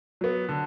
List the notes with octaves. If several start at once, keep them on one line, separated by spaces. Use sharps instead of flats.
F#3 B3
D3